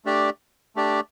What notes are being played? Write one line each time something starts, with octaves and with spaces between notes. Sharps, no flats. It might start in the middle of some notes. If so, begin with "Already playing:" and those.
A3 D4 G4 D5
A3 D4 G4 D5